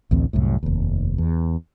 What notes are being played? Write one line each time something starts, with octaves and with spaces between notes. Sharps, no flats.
A1 D2 E3 C4
C2 F#2 A2
F1 D#2
E2